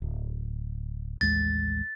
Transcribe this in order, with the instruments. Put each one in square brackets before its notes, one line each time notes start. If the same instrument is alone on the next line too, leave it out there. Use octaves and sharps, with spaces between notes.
[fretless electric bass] D1
[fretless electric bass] A1 D#2 G#3 [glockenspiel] A6